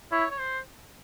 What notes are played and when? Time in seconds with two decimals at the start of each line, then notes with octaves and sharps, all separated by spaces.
0.12 E4 C#5
0.31 C#5
0.39 C5